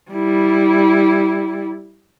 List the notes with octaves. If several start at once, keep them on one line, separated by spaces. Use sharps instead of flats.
G3 E4